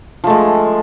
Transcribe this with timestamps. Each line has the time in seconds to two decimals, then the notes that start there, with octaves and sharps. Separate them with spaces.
0.24 F3
0.27 A3
0.30 G#3